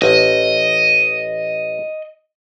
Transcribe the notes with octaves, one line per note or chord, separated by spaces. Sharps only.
A1 D#5